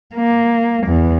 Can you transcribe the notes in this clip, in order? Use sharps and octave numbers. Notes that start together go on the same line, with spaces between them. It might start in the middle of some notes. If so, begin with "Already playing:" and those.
A#3
E2